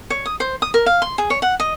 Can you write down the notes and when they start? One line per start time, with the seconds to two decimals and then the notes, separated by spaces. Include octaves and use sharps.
0.10 C#5
0.26 D#6
0.40 C5
0.62 D#6
0.74 A#4
0.86 F5
1.02 C6
1.18 G#4
1.30 C#5
1.42 F#5
1.60 D#5